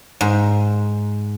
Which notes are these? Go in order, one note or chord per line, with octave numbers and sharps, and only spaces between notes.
G#2